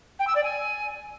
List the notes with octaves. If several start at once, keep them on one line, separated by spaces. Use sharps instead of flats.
G5
E6
D5
G#5